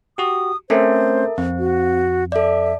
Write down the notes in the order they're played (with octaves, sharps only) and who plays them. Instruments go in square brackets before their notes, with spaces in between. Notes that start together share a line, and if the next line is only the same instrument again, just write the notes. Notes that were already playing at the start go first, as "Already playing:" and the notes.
[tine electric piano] F#4 G4 [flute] D#6
[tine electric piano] A3 C4 C#4 [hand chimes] A4 A#4 E5 [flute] C5
[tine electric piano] F2 [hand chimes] C4
[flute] F#4
[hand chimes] A4 D5 [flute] E5